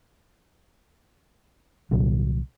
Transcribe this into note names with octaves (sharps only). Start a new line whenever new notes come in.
C2 A#2 D3 F#3